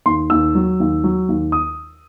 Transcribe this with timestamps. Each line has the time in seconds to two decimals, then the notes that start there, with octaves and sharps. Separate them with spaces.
0.06 D#2 C6
0.30 D#2 E6
0.55 F#3
0.80 D#2
1.04 F#3
1.29 D#2
1.52 D#6